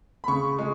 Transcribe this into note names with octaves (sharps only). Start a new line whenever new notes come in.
B5
C#3 C#6
G#3